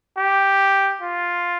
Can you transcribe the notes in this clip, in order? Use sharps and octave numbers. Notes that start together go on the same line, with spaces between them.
G4
F4